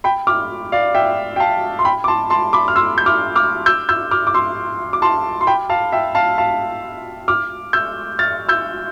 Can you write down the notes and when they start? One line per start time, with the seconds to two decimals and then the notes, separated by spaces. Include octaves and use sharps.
0.04 G5 B5
0.27 D6 F6
0.72 D5 F5
0.95 E5 G5
1.36 G5
1.40 F5 A5
1.79 C6
1.85 G5 B5
2.04 D6
2.08 A5 C6
2.30 A5 C6
2.53 B5 D6
2.68 F6
2.76 C6 E6
2.98 G6
3.06 D6 F6
3.36 D6 F6
3.66 E6 G6
3.89 E6 G6
4.11 D6 F6
4.27 D6
4.34 C6 E6
4.93 D6
5.02 A5 C6
5.41 C6
5.47 G5 B5
5.69 F5 A5
5.92 E5 G5
6.15 F5 A5
6.38 F5 A5
7.28 D6 F6
7.73 E6 G6
8.19 F6 A6
8.49 E6 G6